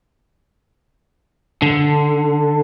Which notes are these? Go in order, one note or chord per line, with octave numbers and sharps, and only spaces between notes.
D3